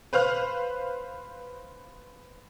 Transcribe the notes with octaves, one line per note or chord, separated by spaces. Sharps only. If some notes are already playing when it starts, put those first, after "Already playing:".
B4 C5 F5 F6 F#6